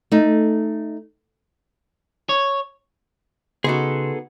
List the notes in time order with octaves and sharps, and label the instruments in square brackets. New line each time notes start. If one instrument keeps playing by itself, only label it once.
[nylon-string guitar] A3 D#4
[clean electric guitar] C#5
[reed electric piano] C#3 C6 [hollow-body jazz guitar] B3 D#4 F#4 [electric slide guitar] G#4 A4